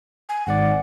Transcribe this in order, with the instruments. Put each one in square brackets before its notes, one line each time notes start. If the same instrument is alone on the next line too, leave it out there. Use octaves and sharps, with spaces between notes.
[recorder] G#5
[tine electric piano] G#1 G#2 D5 [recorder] F#5